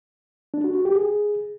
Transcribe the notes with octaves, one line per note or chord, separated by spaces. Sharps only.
D4
F#4
F#4
G4
G#4